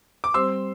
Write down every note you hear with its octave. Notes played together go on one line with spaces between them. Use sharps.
D6
G3 C4 G4 C5 C6 E6